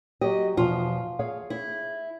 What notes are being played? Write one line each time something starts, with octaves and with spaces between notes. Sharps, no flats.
F#3 G4 D#5
E2 B2 F3 F4
G#4 C#5 F5
E4